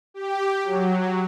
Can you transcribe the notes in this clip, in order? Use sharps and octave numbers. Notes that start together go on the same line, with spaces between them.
G4
F#3